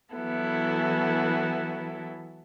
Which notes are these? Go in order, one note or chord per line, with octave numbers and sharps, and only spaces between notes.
E3 F#3 B3 E4 A4